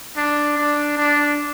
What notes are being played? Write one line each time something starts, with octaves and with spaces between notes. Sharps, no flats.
D4
D4
D4